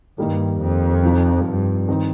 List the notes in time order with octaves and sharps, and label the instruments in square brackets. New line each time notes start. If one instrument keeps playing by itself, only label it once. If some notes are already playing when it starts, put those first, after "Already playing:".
[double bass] G2 [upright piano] D#3 G3 A#3 D#4
[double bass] F2
[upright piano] C3 F3 D#4
[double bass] G2
[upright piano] D#3 C4 D#4